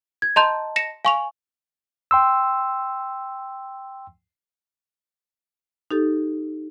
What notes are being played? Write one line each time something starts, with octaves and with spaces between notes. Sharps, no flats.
G#6
D#5 A5 A#5 C6 G6
A#6 C#7 E7
F5 G#5 C#6 F7
G5 C6 E6
D#4 G4 A4